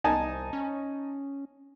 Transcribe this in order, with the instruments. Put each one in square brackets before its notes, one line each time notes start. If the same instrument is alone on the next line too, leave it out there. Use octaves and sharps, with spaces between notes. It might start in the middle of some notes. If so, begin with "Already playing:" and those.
[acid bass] C2 [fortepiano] D#4 G#5 A5
[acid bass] C#4